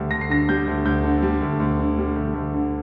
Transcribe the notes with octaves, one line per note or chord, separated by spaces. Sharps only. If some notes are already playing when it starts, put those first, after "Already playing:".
Already playing: D2 G3
D2 A#6
C7
D3 A#6
G3 G6
D2
D2 G6
D3
G3
D2
D2
D3
G3
D2
D2
D3